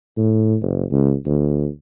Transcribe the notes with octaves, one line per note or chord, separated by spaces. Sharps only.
A2
F#1
C#2
D2